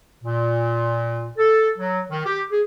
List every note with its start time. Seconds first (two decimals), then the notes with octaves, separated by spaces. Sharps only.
0.23 A#2
1.38 A4
1.78 F#3
2.10 D#3
2.26 G4
2.51 G#4